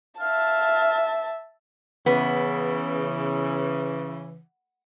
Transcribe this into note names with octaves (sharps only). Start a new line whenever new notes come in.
E5 F5 A5
C#3 E3 B3